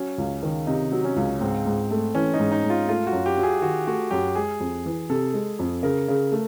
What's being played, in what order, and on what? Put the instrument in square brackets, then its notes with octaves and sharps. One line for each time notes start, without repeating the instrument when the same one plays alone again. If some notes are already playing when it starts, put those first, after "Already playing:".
Already playing: [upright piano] F#3 [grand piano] C#4
[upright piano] C#2
D#3
[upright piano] C3 [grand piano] D#4
[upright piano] F#3
[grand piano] C#4
[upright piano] C#2
[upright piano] G#2 [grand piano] C4
[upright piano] G#2
A3
[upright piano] E3 [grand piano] C#4
[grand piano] D#4
[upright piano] G#2
[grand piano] D#4
[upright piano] G#2
[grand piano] F4
[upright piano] A3 [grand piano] F4
[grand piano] F#4
[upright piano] F#2
[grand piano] G4
[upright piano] F#3
[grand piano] G#4
[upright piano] D#3 [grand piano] F#4
[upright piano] A3 [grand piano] F#4
[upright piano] F#2 [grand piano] G4
[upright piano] G#3 [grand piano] G#4
[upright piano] F2
E3
[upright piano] C3 [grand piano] A4
[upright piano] G#3
F2
[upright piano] C#3 [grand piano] A#4
[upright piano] C#3
A3